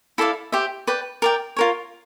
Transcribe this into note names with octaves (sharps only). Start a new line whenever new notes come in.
E4 A4 D5 F5
G4 C5 E5
B4 D5 G5
A#4 D5 G5
F4 A#4 C#5